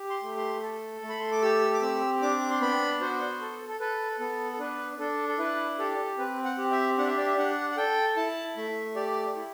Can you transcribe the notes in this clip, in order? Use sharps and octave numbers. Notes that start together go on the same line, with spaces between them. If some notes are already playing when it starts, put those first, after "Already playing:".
Already playing: G4
C6
A3
C6
A4
A3
B5
C6
D6
G4 E6
D6
C4 E6
D4 D6
C6
B3 B5
F#4 C5
A4
A4
A4 B4
B3 A4
A4
D4 B4
D4 A4
A4
E4 B4
G4 A4
C4 B4
F#5
G4
E5
D4 F#5
E5
D5
E5
D4 F#5
F#5
A4 G5
E4 A5
A3 E5
G4 D5
E4